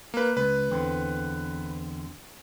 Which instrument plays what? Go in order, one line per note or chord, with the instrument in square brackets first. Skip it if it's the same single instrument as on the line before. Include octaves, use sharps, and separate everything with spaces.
[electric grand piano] A#3 B4
[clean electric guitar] C#2 [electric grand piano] B4
[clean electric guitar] E2 D3 C4